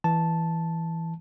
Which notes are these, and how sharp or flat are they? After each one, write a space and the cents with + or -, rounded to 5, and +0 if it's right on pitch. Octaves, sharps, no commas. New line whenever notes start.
E3 +0 A5 -5